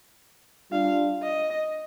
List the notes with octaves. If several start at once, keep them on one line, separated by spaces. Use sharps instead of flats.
G3 D4 F4 F5
D#5